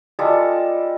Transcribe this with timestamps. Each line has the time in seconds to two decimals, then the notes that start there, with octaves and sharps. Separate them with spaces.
0.19 G3 G#3 F4 A4